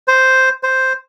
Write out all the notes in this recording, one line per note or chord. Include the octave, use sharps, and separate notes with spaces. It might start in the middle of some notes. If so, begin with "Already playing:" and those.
C5
C5